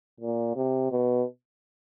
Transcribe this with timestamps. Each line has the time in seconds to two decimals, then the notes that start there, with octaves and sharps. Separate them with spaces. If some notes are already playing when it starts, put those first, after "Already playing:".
0.21 A#2
0.56 C3
0.92 B2